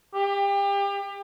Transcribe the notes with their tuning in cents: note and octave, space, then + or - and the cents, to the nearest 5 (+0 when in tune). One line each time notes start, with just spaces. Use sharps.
G4 +30